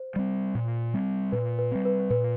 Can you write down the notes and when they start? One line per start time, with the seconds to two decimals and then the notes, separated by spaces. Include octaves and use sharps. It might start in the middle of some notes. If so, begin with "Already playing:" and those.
Already playing: C5
0.16 G3 C4
0.55 A#2
0.94 G3 C4
1.32 A#2 B4
1.59 B4
1.71 G3 C4
1.85 B4
2.10 A#2 B4